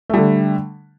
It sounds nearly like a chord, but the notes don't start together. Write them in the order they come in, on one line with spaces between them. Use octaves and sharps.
A3 G3 D3